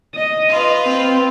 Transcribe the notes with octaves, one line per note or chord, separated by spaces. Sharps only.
D#5
F4 B4
C4